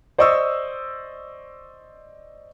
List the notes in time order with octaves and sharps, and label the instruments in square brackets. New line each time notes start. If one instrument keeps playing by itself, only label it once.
[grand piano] C5 D5 D#5 C#6 D#6 E6